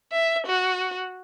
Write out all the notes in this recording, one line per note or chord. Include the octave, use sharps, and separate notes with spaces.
E5
F#4